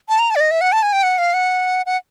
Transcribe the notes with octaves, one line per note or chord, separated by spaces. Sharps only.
A5
A#5
A5
D5
D#5
E5
F#5
A5
G#5
G5
F#5
F5
F#5
F#5